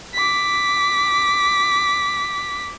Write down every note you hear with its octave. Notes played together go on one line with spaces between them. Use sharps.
D6 B6